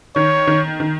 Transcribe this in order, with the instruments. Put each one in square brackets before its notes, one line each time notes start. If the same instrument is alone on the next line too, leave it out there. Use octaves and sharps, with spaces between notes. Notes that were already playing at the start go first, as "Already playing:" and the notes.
[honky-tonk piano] D#3 [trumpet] C#5
[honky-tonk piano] D#3
D#3